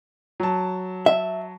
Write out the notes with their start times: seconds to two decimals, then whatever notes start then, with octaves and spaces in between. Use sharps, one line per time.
0.40 F#3 A5
1.06 E5